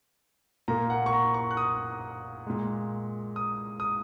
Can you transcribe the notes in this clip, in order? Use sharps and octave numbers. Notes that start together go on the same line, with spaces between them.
A#2 A#3 A#5
F#5
C#6
A#5
C#6
F#6
D#6
A#2 G#3
D#6
D#6